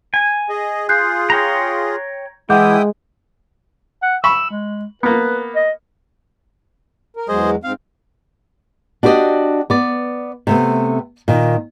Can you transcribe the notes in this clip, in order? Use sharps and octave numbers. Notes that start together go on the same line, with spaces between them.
G#5
G#4 D#5
F4 G#4 F#6 G6 C7
C#5 G5 A#5
E3 G#3 E4 F#5 G5 D6 D#6 G6
F#5
B5 C#6 E6
G#3
A#3 B3 B4
D#5
A#4
E2 F#3 G#3 G#4 C5 D#5
G#2 C4 F5
D4 F#4 G4 B4 D5 D#5
B3 D5
C3 A3 B3
A#2 D#3